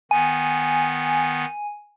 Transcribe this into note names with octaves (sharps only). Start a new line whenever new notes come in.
D#3 B3 G#5